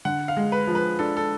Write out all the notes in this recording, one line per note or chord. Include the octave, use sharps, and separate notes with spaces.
D3 F#5
F5
G#3
B4
F3
B4
D4 A4
A4